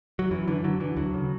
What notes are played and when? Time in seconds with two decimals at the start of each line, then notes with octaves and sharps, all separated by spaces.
0.19 F#3
0.31 F#2 E3
0.48 D3 E3
0.64 D3 F#3
0.80 D3 E3
0.96 D2 F#3
1.14 C#3